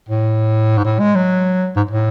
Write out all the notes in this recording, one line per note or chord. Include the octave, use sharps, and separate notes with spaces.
A2
G#2
A2
G#3
F#3
G#2
A2